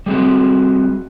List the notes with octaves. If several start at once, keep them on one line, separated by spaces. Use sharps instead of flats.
G3 G#3 C4 F#4